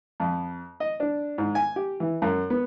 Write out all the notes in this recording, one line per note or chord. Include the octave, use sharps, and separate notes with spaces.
F2
D#5
D4
G#2
G#5
G4
E3
F#2
B3